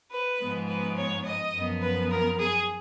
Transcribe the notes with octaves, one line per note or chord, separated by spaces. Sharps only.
B4
G#2 F3 G#3 B3
B4
C#5
D#5
F#2 F3 B3
B4
A#4
G#4